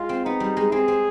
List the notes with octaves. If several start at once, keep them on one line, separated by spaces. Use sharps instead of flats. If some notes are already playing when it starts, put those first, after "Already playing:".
Already playing: G#3 F4
C4
B3 D#4
G3
G#3
C4 G#4
C4